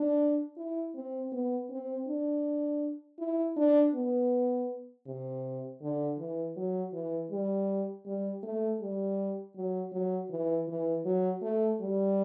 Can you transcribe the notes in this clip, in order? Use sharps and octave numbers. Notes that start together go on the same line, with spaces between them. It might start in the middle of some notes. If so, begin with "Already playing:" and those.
Already playing: D4
E4
C4
B3
C4
D4
E4
D4
B3
C3
D3
E3
F#3
E3
G3
G3
A3
G3
F#3
F#3
E3
E3
F#3
A3
G3